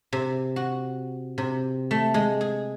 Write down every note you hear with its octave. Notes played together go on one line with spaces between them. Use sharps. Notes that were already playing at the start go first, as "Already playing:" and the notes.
C3
F#4
C3
A3
G#3
G#4